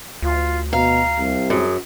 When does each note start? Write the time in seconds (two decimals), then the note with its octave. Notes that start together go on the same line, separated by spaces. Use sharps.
0.22 D2 F4
0.73 B2 F5 A#5
1.18 C2 C3
1.50 F#2 G#4